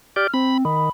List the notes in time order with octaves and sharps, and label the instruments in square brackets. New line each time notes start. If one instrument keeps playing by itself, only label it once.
[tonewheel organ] G4 D5 [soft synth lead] F6
[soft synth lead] C4 [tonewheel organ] B5
[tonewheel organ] D#3 [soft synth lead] B5